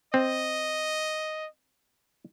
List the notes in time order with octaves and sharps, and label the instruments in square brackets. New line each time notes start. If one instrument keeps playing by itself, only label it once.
[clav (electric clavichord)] C4 [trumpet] D#5